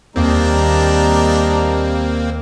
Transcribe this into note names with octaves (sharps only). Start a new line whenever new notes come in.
D#2 G3 A#3 C4 D4 D#4 A#5